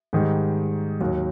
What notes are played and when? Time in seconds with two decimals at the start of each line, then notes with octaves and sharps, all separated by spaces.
0.13 G#2 D#3 G3
1.01 D#2 D#3 F#3